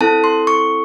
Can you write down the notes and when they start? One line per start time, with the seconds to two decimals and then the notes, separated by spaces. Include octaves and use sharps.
0.01 C4 E4 A4 A5
0.24 C6
0.47 C#6